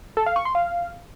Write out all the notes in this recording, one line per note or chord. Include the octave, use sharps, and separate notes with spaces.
A4
F5
C#6
C6
F5